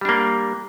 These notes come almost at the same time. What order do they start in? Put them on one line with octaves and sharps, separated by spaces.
G3 D4 A#3